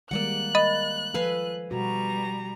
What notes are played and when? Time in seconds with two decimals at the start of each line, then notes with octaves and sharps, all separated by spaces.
0.11 D#3 G3 G#3 A#3 D5 F#5 F#6
0.55 D#5 B5 A6
1.14 F3 A4 B4 F5 G#5
1.71 B2 G3 F#4 A#5